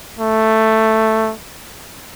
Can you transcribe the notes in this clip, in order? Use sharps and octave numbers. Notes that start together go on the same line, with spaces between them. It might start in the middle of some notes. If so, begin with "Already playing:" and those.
A3